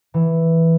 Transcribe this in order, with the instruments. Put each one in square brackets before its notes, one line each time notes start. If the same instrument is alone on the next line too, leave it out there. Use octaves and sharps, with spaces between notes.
[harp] E3